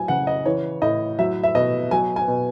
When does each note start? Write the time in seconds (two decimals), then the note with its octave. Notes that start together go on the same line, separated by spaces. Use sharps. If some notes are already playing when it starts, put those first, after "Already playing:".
Already playing: A2 F#3 G#5
0.08 C#3 F#5
0.27 D#5
0.45 E3 C#5
0.82 A2 D#5
1.19 F#3 E5
1.43 E5
1.55 B2 D#5
1.91 F#3 G#5
2.16 G#5
2.28 B2